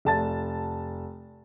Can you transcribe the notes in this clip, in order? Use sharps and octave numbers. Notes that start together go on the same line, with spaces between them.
F1 A5 A6